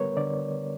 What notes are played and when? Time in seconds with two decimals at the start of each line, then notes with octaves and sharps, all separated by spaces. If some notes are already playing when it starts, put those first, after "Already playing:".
Already playing: D3 G3 B3 A#4 B4 C#5
0.17 D3 D5